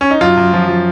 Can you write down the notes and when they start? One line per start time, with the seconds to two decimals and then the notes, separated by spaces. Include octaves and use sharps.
0.01 C#4
0.11 D#4
0.21 F#2 F4
0.37 F#2
0.54 F3
0.69 F3